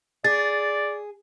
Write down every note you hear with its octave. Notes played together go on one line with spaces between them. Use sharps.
G#4 D5 A6